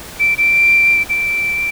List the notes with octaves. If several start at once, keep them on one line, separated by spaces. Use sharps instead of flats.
D7
D7
D7